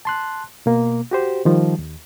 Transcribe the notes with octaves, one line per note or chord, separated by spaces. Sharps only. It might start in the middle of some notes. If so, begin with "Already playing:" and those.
A5 C6 F#6
B2 A#3
F#4 G4 C5
D#3 F3 G3
D#2